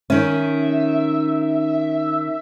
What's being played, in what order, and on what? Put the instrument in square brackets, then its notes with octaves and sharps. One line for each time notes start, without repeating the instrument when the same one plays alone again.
[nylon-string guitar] D#3 C#4 [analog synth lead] E5